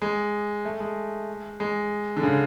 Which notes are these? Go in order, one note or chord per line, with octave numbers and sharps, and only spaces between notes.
G#3
A3
G#3
G#3
D3
C#3